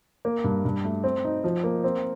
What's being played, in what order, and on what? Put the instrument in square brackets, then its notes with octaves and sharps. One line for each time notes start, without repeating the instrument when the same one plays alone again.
[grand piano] A#3
G2
G2
A3
C4
D#4
F3
A#3
C4